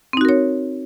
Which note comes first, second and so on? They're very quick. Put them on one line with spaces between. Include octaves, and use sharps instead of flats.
C4 D#4 F#4 A#4 C#5